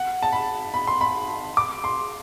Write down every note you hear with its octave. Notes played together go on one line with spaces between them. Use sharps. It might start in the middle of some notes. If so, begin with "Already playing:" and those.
Already playing: F#5
A5
B5
B5
C6
B5
D6
C6